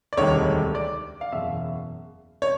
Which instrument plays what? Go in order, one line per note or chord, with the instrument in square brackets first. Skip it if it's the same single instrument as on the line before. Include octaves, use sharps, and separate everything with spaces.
[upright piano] D5
E1 D2 C3 D#3 G3 C#5
D5
F5
F#1 E2 B2 E5
C#5